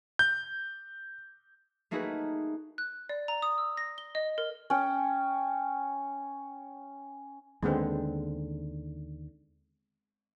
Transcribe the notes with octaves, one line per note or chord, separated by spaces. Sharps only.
G6
A3 A#3 D#4 F#4 G#4 B4
F#6
D5
A#5
D#6
E6
A#6
G7
D#5
A#4
C#4 G5
D#2 D3 G#3 B3 C4